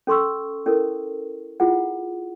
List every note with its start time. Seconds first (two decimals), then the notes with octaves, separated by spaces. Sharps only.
0.07 C#4 A4 C6 C#6 E6
0.66 C#4 E4 A4 A#4
1.60 E4 F4 G#4 F#5